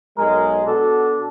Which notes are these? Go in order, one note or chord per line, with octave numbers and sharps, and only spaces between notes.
B1 G#3 A#4
B2 D4 F#4 A4